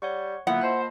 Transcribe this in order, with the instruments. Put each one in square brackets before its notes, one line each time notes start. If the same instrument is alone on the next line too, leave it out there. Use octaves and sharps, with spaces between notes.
[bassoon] G3 [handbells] C#5 F#5 C#6
[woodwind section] D3 F#3 B3 [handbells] A#3 F4 [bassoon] E4 [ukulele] F#5
[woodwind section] C5 [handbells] D#5 A5 B5